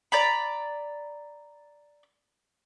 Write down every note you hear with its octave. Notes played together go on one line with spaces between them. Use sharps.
D5 A#5 B5